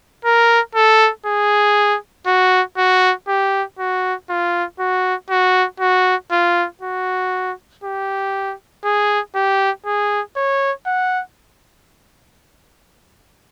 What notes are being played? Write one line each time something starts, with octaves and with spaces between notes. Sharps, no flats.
A#4
A4
G#4
F#4
F#4
G4
F#4
F4
F#4
F#4
F#4
F4
F#4
G4
G#4
G4
G#4
C#5
F#5